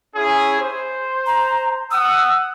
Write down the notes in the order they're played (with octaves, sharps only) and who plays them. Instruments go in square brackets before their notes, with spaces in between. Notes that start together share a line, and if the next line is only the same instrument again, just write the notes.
[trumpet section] C#4 E4 G#4
C5
[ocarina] A#5
[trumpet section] F#5 D#6 [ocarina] E6